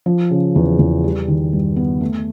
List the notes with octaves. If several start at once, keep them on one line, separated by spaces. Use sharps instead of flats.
F3
C#3
E2
E2
G3
D#3
G2
B3
A3